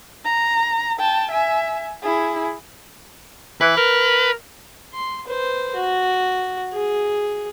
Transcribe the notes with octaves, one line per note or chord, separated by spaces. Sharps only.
A#5
G5 A5
E5 G#5
E4 G#4
E3 B4
A#4
C6
B4 C5
F#4
G#4